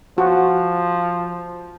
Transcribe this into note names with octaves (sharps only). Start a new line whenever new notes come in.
F3 F#4